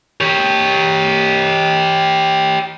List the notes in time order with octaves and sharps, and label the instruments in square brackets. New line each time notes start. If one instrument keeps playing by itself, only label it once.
[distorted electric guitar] G4 C#5